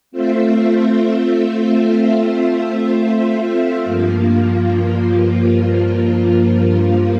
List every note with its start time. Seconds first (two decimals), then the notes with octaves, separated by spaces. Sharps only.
0.11 A3 C4 F4 C5 E5
3.81 G2 F3 A#3 F4